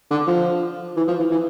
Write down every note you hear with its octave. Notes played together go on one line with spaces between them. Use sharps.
D3
F3
E3
F3
E3
E3